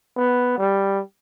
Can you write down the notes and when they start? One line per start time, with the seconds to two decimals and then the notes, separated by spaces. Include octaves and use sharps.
0.17 B3
0.58 G3